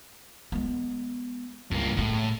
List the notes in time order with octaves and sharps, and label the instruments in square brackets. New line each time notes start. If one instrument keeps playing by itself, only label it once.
[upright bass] G#3 B3
[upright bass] C#2 [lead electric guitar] G2 A#3
[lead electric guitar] A2 [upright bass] D3 G#3